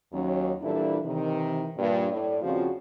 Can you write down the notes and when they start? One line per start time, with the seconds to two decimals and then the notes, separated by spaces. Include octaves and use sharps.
0.12 D#2 F#3 C#4
0.62 A#2 E3 G3 D4 E4 A4
1.04 C3 D#3 E3
1.77 G2 A#2
2.11 A2 D5
2.42 D#2 C#3 F3 C4 F4 F#4